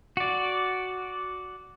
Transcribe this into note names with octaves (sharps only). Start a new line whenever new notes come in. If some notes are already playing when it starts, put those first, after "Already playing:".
F#4 D5